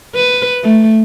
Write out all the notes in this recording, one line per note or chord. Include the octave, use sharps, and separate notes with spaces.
B4
A3